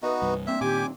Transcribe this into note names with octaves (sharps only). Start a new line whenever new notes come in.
B3 D#4 F#4 B4 D#5
C2 G2
A#3 C4 D4 E5
A#2 D#3 G4 G#5 D6